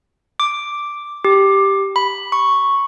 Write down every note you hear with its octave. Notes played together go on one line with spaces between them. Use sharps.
D6
G4
B5
C#6